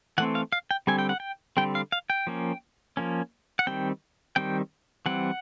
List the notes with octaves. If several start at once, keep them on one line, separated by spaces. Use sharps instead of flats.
E3 A3 C4 F#5
F5
F5
G5
D3 G3 C4 G#5
G5
F#5
G5
D3 G3 C4 G5
F5
F5
G5
F3 A#3 C#4
F3 A#3 C#4
F#5
D#3 G3 C4 G5
D#3 G3 C4 G5
E3 G3 C4 F#5